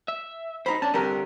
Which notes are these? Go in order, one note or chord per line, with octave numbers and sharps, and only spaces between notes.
E5
D#4 F4 C5 A#5 B5
C#4 D4 A5
C2 D3 G4 A#4